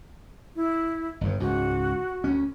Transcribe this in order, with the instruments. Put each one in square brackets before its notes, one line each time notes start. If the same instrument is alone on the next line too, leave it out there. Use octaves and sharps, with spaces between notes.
[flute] E4
[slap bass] G1 G2
[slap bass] C#2 G#2 [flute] F#4
[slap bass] D2 C#4